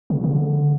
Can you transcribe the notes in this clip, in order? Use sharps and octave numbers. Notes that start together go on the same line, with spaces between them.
C#3
C#3
D3